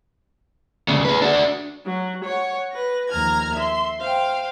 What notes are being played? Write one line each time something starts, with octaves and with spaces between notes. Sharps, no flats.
D2 C#3
G#4 B4
D4 F#4
F#3
C#5 F#5
B4 A#6
D#2 F3 A#5 F6 G#6
E5 C6
C5 F5 G5